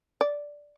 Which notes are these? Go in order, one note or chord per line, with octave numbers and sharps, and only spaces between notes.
D5